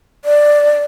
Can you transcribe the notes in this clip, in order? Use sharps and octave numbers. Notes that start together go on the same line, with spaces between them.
D5